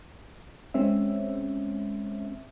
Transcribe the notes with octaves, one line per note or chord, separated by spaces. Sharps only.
G#3 C4 C#4 E5